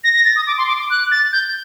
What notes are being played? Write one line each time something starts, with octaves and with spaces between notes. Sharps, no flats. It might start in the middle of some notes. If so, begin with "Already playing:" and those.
A#6
A#6
A6
D#6
D6
C6
D6
D6
F#6
A6
G6